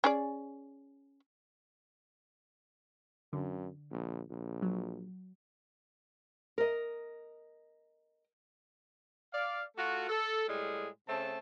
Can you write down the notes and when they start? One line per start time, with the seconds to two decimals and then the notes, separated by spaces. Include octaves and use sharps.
0.04 C#4 G#4 D5
3.33 F#2 D3
3.91 A#1
4.30 A#1
4.62 F#3
6.58 A#4 D#5
9.32 D5 F5
9.76 A3 F4 F#4
10.09 A4
10.48 A2 G3 G#3 G#4
11.08 C#3 A3 C4 A5